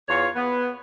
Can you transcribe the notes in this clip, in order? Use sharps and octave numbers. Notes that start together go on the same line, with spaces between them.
E2 F4 C#5
B3